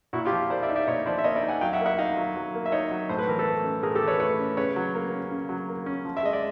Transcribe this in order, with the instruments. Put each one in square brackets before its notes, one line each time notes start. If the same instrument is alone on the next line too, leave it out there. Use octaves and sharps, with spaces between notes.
[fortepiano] A#2 E4 F#4
F4 G4
F3
A#3 C5 D5
D5 E5
D#4
D5 E5
A#2 C#5 D#5
F3 C5 D5
E5
A#3 C#5 D#5
D5 E5
D#4
F#5 G#5
F#3 F5 G5
E5 F#5
A#3
E5 F#5
D#4 D#5 F5
F#3
F#3
A#3
E5
D#4 C#5 D#5
F#3
A2 C5
B4
E3 A#4
A4 B4
A3
C#4
A2 G#4 A#4
G4 A4
E3
B4 C#5
A3 B4 C#5
C#4
C#3 B4 C#5
F#3
A#3
C#4
C#3
F#3
A#3
C#4
F3
E5
G#3 D#5
D5